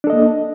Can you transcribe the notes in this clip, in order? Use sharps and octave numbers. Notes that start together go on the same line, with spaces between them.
A#3 D4 A4 D#5